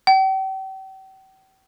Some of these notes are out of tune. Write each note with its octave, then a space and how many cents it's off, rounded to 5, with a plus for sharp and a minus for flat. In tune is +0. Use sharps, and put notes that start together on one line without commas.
G5 -40